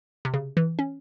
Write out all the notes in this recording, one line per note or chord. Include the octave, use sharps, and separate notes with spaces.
C3
C#3
E3
C#4